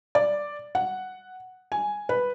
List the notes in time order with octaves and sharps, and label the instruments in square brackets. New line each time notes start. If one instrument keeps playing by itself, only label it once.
[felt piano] D5
F#5
G#5
B4